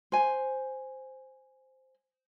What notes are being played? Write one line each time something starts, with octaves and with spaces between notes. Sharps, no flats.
C5 G#5